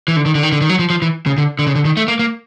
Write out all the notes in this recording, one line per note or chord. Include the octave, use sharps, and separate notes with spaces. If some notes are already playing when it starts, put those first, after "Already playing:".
E3
D3
D#3
D3
D#3
D3
D#3
F#3
F3
F3
E3
C#3
D3
D3
C#3
D3
D#3
A3
A#3
A#3